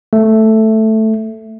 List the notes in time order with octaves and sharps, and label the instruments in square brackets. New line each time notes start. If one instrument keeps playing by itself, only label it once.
[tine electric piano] A3